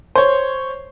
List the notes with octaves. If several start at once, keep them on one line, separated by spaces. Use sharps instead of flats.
C5 C#5